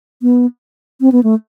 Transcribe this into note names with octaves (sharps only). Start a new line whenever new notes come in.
B3
C4
B3
A3